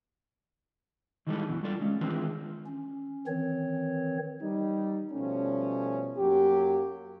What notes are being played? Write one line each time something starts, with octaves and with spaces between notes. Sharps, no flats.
D#3 E3 G3 G#3 D#4 A4
F#2 B2 D3 E3
G3 F4 A4 D5
G#3 C#4
D#3 E3 G#3 C4 D4 F4
C#4
D#3 E3 C4 C#5
G3 D#4
B2 F3 G3 A3 C#4
F#2 F#3 A#3 G4